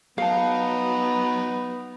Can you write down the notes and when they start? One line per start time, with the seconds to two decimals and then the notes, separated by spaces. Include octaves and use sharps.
0.18 F#3 B3 D#4 F5 A5